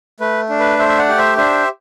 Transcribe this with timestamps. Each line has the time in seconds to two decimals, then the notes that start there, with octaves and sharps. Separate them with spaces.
0.20 A3 B4
0.49 D4
0.59 B4
0.79 A3 C5 E5
0.89 E5
0.98 D5 F#5
1.09 G4
1.18 C5 E5
1.37 D4 C5 E5